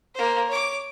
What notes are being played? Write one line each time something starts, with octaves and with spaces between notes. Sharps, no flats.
A#3 C5
C#5 D6